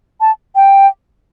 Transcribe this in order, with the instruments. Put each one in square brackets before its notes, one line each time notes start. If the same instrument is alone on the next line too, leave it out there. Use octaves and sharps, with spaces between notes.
[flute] A5
G5